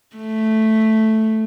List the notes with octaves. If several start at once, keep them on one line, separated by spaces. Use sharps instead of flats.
A3